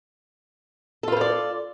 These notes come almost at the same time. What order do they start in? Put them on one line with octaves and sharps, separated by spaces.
A4 F4 B4 C5 D5